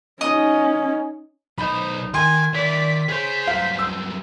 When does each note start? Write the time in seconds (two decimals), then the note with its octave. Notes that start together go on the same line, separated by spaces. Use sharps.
0.21 C#4 D#4 D#5 D#6
1.58 B1 D#4 C5 B5
2.14 D#3 G#5 C6
2.55 D#3 D5 E5 B6
3.09 G#4 C5 C#5
3.47 G2 F#3 F5
3.79 E6